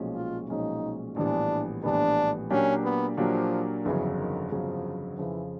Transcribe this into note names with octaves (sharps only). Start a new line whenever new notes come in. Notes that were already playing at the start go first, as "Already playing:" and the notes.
Already playing: B1 A#2 F3 G#3 C#4
F4
B1 A#2 F3 G#3 C#4 D#4
A#1 A2 E3 G3 B3 D4
A#1 A2 E3 G3 B3 D4
A#2 F#3 A#3 C#4 D4 G4
B3
A#2 F3 F#3 A#3 D4 G4
G1 F2 C#3 E3 F#3
D#3
G1 F2 C#3 F3 F#3
F2 C#3 E3 F3